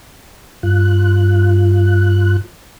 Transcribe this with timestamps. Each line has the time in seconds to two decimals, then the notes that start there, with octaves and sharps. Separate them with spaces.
0.63 G2 F4 F#6